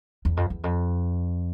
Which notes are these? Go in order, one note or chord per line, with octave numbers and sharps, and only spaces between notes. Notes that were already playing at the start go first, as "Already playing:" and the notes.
E2
F2
E2
F2